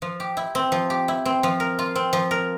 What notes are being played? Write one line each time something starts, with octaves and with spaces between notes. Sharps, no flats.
F3
G4
E4
C4
F3
G4
E4
C4
F3
A#4
F4
C4
F3
A#4